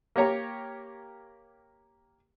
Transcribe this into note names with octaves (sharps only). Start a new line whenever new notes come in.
A#3 G4 C#5 A#5